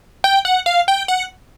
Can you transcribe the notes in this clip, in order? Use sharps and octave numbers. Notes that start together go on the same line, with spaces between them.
G5
F#5
F5
G5
F#5